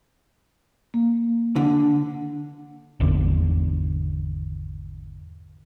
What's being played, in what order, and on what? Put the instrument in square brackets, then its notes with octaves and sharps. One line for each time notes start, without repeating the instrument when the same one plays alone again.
[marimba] A#3
[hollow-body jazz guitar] D3
[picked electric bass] G#1 E2 D3